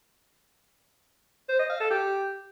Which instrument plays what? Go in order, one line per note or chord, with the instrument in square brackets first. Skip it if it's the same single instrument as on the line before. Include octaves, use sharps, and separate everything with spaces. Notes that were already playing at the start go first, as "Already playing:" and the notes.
[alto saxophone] C5
D#5
F5
A4
G4